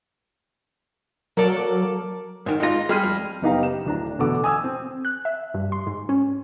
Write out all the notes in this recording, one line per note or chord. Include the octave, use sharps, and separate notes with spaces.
F#3 A#3 A4 A#4 D5
G#2 D#3
G#3 D#4 F4 A#6
G3 G#3 F6 D#7
F2
F#1 B3 D#4 G4 F5 A#5
E7
D1 D4 A#5
E2 B2 D3 A4 F#5 D6
G#5 D#6 E6 G#6
C4
F#6
E5
G2
C6
G#2
C#4